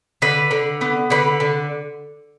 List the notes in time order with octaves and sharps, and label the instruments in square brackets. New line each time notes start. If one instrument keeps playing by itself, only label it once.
[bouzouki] D3 B4
D3
B3
D3 B4
D3